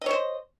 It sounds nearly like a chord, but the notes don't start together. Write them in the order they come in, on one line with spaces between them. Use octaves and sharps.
D#5 C#5 C5